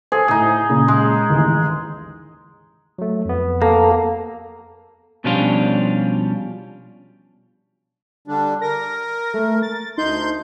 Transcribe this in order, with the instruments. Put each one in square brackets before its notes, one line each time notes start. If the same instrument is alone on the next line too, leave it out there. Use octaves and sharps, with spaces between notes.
[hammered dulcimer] G#4 [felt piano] A4 C5
[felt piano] A2 D#6 [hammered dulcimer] D#4 G#4
[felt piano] A#2 C#3
[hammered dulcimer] G#3
[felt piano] A1 D#2
[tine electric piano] F#3 A3
F2 B3
[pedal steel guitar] A#3 [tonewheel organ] A4
[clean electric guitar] B2 F3 G3 C#4 D4 F4
[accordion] D3 G3 D4
[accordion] A#4 [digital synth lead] A#6
[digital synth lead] A3
A6
[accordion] D2 C6 G6 [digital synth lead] D#4